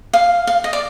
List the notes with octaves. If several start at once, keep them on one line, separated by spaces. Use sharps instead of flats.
F5
F5
D#5
D5